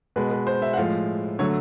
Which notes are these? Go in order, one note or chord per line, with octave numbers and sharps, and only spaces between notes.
B2 G#3 B4
B4
C5
E5
F#5
A2 F3 G#3 F5
D3 F#3 A3 C#5